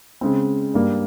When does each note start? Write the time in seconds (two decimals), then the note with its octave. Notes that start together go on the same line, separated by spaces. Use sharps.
0.21 C#3 G#3 C4
0.74 G2 G3 A#3